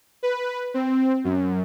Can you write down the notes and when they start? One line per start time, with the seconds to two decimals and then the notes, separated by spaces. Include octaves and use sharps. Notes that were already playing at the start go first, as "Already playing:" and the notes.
0.23 B4
0.74 C4
1.24 F#2